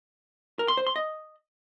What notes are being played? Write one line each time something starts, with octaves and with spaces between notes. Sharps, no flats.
A#4
C6
C5
C6
D#5